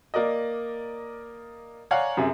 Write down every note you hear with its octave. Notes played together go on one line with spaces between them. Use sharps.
A#3 A#4 D5 D#5
C#5 D5 F5 F#5 G#5 A#5
F#2 C3 G#4 E5